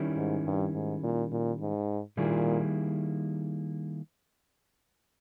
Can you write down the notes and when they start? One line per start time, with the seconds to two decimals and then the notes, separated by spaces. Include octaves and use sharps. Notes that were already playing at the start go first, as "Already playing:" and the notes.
Already playing: D#3 G3 C#4 E4
0.16 G#2
0.45 G2
0.74 G#2
1.03 A#2
1.32 A#2
1.60 G#2
2.17 A#2 D#3 G3 A#3 E4 G#4